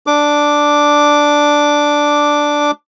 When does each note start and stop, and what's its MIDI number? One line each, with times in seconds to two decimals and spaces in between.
0.07 2.71 62
0.07 2.71 86